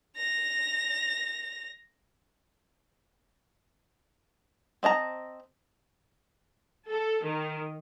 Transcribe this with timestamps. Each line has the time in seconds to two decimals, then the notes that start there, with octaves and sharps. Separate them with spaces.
0.17 A#6 F7
4.83 C4 D#5 A5 A#5
6.89 A4
7.24 D#3